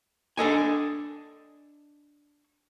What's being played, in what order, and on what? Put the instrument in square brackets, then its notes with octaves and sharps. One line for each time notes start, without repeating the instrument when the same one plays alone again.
[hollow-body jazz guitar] D4 A4 D#5 G#5